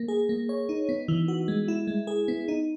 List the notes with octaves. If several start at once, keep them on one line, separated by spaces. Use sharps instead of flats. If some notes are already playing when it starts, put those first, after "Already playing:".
Already playing: A#3
G#4
A#3
C#5
D#4
B3
E3
F#4
G#3
E4
G#3
G#4
B3
D#4